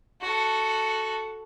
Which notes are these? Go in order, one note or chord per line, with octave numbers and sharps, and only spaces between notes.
F#4 A4